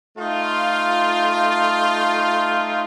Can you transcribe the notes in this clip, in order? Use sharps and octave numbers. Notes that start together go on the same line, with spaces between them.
A3 D#4 F4